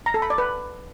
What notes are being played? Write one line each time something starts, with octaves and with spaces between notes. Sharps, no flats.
A#5
A4
B5
D5
B4